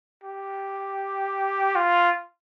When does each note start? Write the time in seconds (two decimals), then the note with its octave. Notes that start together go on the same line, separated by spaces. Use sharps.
0.23 G4
1.75 F4